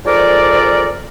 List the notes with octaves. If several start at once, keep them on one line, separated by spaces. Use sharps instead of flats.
G#2 F3 A4 A#4 D5